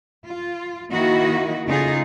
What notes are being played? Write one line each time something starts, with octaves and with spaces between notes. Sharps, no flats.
F4
D#3 A#3 E4 F#4 D#5
C#3 A3 D#4 F4 G#4